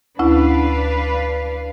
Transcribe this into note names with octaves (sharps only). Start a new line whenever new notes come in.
D2 C#4 D4 E4 B4 F5